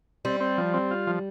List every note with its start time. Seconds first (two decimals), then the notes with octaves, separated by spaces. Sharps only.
0.25 G3 C4
0.41 C4
0.58 F3
0.74 C4
0.91 F4
1.07 F3